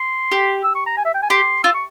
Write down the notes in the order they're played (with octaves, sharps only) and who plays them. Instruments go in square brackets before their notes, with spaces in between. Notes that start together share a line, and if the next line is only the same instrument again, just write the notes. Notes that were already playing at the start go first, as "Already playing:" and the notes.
Already playing: [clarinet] C6
[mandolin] G4
[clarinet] E6
C#6
A#5
G#5
E5
G5
G#5
[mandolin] G4 [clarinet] C6
[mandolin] F4 [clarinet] E6
[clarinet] C#6